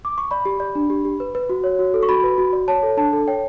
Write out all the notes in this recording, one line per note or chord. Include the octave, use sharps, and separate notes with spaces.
D6
C#6
D5 B5
G4
D5
D4
G4
G4
B4
B4
F#4
C#5
F#4
A4
C#6
F#4 B5
B4
F#4
D5
C#5 A5
A4
D4 A5
A4
C#5 G5